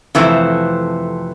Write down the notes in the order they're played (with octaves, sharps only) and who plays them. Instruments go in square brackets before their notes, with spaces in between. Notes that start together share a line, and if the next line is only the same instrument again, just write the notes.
[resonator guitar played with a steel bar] F2 C3 E3 A3 C4